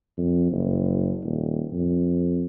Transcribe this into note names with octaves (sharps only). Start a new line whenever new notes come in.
F2
F#1
D#1
F2